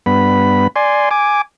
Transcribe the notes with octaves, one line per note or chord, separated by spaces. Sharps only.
G2 B3 B5
D5 G#5 C6
G#5 D6